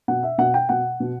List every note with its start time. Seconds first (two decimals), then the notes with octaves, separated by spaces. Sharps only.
0.08 B2 F#5
0.23 E5
0.38 B2 F#5
0.54 G5
0.69 B2 F#5
1.00 B2